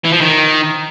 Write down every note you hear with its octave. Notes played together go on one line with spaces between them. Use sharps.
E3
F3
D#3